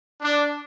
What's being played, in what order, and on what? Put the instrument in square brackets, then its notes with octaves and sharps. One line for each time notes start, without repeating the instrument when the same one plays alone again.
[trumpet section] D4